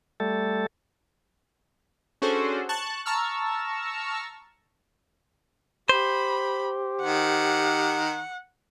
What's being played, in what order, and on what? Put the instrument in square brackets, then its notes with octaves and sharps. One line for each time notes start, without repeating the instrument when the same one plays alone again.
[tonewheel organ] G3 A3 A4
[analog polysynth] C#4 D4 F#4 G#4 A4 C5
A5 C#6 F#6
A5 A#5 C#6 E6 F6
[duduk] G4 [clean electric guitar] C5 [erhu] B5
[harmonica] D#3 [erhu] F#5